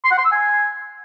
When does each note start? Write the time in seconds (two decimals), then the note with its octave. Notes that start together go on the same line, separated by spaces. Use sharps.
0.05 C6
0.11 F#5
0.18 C6
0.25 E6
0.32 G#5